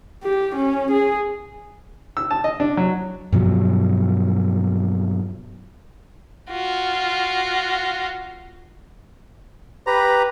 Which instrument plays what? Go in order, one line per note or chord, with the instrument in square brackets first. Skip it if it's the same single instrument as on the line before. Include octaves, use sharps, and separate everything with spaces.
[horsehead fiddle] G4
C#4
G#4
[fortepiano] E6
A5
D#5
D4
F#3
[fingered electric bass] G2 B2 F3 F#3
[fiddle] F4 F#4
[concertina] G4 A#5 [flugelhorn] B4